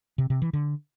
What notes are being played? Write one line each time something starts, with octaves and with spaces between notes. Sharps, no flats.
C3
C3
E3
D3